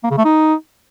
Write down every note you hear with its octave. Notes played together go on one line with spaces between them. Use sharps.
A#3
C#3
A3
D#4